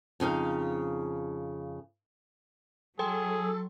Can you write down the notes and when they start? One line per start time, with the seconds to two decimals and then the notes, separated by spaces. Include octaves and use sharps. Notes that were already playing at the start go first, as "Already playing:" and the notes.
0.20 F2 C#3 D#4 F5
2.99 F#3 G#4 A4 G5 C6